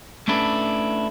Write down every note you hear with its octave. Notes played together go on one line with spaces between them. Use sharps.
A3 C#4 D4 E4 A4 B4